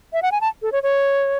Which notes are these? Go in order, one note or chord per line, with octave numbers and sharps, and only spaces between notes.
E5
F#5
G#5
A5
A4
C#5
C#5